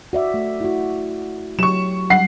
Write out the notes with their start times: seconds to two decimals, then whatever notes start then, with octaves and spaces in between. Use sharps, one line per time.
0.13 F#4 D5 E5
0.34 A3
0.61 E4 F#4
1.59 F#3 G4 C#6 E7
2.10 F#3 G3 F#5 C7